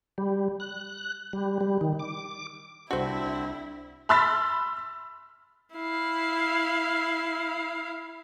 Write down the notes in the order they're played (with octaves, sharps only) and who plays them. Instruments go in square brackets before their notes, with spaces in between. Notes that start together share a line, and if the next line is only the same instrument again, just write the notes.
[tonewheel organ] G3
F#6
G3
G3
D#3
D6
[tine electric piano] C2 D4 [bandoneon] D3 C4 [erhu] E4 [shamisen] F#4 C5
[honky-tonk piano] B5 C6 E6 F6 A6 B6
[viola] E4 F5